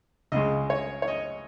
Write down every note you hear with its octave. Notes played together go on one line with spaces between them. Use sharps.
C#2 C#3 G#3 D#5
C#5
C#5
D#5